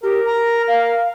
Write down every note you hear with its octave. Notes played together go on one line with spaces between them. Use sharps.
G4 A#4
A#5
F5